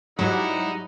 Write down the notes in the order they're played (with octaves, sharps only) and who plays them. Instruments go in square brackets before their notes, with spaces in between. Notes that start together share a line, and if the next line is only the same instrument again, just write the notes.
[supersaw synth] G#2 F#3 [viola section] G3 F#5 [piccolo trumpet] D#4 [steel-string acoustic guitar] E4